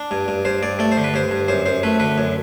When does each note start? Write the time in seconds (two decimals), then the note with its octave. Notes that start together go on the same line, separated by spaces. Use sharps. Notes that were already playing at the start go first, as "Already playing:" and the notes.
Already playing: D4
0.11 G2
0.28 G2
0.45 G2 C5
0.63 G2 D5
0.79 A3 D5
0.92 C5
0.97 D3
1.04 B4
1.14 G2 C5
1.31 G2
1.48 F#2 C5
1.66 F#2 C5
1.83 A3 B4
2.00 D3 B4
2.18 F#2